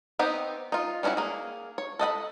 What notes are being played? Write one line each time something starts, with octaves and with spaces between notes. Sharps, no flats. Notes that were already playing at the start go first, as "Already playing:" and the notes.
B3 C4 D#4 G4
D#4 F4
G3 C#4 D4 E4 F#4
A#3 G#4
C#5
A4 D#5 F#5 B5